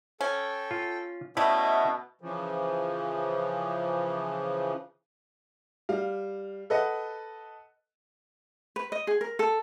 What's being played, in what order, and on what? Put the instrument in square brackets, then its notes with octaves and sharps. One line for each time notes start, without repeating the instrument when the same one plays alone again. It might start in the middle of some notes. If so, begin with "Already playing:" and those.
[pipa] C#4 [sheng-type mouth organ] A4 G5
[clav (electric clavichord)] F4
[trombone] B2 [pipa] G3 A3 [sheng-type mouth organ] C#4 D#5 E5 [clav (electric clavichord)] E4
[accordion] C#3 E3 F3
[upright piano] G3 F5
A4 B4 D#5 F#5
[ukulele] B4
D#5
G#4
A#4
A4